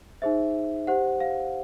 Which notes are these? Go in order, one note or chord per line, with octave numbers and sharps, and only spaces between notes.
D#4 G#4 C5 E5
G4 C5 F#5
F5